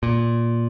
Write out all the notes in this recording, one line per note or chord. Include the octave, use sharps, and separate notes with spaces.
A#2